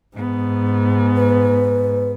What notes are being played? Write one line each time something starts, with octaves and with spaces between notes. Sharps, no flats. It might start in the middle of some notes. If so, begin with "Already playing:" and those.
G#2 B3
B4